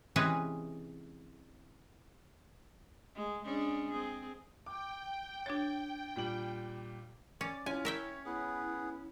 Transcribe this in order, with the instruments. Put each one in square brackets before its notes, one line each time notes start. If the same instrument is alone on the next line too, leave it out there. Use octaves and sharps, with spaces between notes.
[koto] C3 E3 G#3 C#4 G#4 B4
[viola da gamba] G#3
G#3 C#4 D4
C4 G#4
[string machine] G5 [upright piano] D6
[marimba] D4 C#5 [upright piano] G#6 A6
[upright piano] A#2 G3 F#7
[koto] C#4 [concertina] D5 [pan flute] D6
[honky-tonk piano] C#4 [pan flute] E4 [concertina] F4 [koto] G#5
[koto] A#4 E5 G5 [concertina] C#5
[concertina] B3 G#4 [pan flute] E4